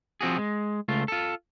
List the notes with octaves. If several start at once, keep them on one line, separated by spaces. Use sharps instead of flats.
F3 C4 F#4 G#4
G#3
C#2 A3 F4
F4 A4